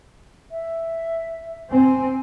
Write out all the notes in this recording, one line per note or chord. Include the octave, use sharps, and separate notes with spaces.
E5
C4 G#5